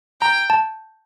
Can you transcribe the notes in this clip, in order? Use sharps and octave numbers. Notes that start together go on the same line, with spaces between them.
G5 A#5
A5